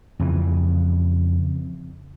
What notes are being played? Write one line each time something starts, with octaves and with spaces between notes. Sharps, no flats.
F2 C#3 E3